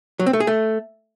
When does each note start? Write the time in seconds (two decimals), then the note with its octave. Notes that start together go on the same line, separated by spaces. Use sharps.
0.19 F#3
0.26 C4
0.33 A3
0.40 G#4
0.47 A3